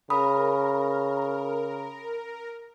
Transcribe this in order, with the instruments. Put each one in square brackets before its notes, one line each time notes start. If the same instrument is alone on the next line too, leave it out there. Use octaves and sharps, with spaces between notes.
[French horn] C#3 [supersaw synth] A#4 [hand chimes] B5 D#6